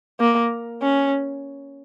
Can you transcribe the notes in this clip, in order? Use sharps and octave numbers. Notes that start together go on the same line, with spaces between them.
A#3
C#4